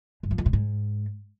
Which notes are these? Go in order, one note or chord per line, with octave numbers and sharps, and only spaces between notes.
G2
F3
F2
A2
G#2